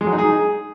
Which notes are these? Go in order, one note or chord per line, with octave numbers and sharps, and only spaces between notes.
G#3
F#3
D#4
G#4